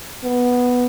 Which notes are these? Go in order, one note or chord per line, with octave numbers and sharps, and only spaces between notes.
B3